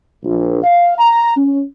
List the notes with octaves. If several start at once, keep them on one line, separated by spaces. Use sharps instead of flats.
A#1
F5
A#5
C#4